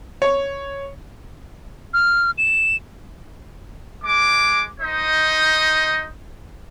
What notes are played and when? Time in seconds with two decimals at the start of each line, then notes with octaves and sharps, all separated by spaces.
0.22 C#5
1.93 F6
2.38 E7
4.04 G#3 D6
4.80 D#4 C5 D#5